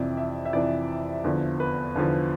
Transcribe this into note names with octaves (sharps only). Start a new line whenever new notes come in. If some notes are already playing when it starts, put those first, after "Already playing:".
Already playing: F2 C3 E3 D5
E5
E5
F2 C3 E3 D5
E2 D3 F3
B4
E2 D3 F3